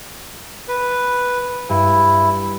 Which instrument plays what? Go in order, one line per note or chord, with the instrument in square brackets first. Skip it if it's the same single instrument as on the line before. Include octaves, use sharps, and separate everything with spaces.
[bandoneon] B4
[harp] G2 [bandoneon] E4